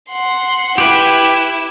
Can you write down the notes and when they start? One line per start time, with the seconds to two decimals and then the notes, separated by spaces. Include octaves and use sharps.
0.10 F#5 C6
0.78 E4 G4 B4 E7